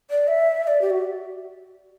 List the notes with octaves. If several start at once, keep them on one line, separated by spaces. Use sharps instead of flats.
D5
E5
E5
D5
G4
F#4